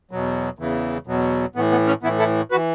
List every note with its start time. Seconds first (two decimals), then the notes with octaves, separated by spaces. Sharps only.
0.11 E2 B2 F#3
0.59 E2 C#3 E3
1.07 E2 B2 F#3
1.56 A2 E3 B3
1.71 B3
1.87 C#4
2.03 A2 E3 B3 E4
2.19 E4 A4
2.51 F#4 B4
2.55 E3